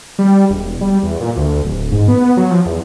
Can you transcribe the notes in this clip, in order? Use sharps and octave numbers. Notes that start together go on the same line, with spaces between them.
G3
E1
G3
E2
A#2
D2
D1
G#2
B3
F#3
F3
E2